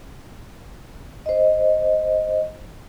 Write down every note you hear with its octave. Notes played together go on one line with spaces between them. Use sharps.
C5 D#5